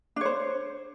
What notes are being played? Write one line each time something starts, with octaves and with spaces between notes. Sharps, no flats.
D4 C5 C#5